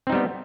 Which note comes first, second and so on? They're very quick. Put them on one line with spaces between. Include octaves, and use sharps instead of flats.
C4 D#4 G3 B3